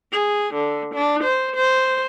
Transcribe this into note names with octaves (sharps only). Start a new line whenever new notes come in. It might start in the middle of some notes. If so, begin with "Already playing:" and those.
G#4
D3
D4
C5
C5